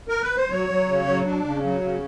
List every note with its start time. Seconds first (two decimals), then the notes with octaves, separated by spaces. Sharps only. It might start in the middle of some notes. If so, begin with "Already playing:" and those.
0.08 A#4
0.22 B4
0.36 C5
0.50 F#3 C#5
0.69 F#3
0.88 C#3
1.06 F#3
1.25 D4
1.44 C#3
1.64 F#3
1.81 C#3